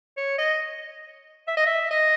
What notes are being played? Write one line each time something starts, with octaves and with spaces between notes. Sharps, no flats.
C#5
D#5
E5
D#5
E5
D#5